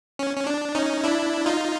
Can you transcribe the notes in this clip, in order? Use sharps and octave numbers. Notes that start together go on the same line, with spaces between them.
C#4
C#4
D4
C#4 D#4
D4 E4
D#4 F4